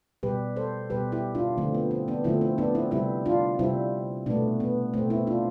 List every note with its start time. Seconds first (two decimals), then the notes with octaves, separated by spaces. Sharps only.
0.23 B2 G3 G4 B4
0.56 A4 C5
0.90 B2 G3 G4 B4
1.12 E4 G4
1.35 D4 F4
1.57 D3 F3 A3 C4
1.74 B3
1.91 C4
2.08 B3 D4
2.24 D3 F3 A3 C4 E4
2.41 C4
2.58 B3 D4
2.75 C4 E4
2.91 C3 G3 C4 E4
3.26 D4 F4
3.59 C3 G3 C4 E4
4.26 B2 A3 B3 D4
4.60 B3
4.94 B2 A3 C4
5.10 C4 E4
5.27 D4 F4